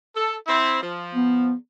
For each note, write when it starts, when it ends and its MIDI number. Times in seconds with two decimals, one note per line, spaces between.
0.15 0.35 69
0.47 0.81 60
0.47 0.81 64
0.82 1.52 53
1.14 1.54 59